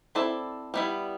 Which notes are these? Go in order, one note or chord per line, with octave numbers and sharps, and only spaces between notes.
C4 E4 A4 D5
G3 B3 E4